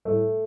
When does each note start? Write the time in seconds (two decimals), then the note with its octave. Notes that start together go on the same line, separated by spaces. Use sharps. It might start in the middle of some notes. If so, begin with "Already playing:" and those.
0.05 A2 G3 A3